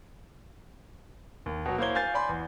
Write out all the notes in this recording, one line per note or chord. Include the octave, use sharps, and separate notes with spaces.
D#2
B2 F#3
A#3 E4 C5 C#5 G#6 G7
F5 G#5 G6 A6 C7
D5 G#5 B5 C6
E2